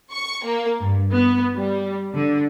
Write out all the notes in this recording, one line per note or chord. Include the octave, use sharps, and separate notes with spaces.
C#6
A#3
G2
B3
G3
D3